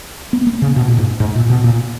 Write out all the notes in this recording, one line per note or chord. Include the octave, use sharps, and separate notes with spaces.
B3
A#3
C#3
B2
A#2
G#2
G#2
A#2
B2
A#2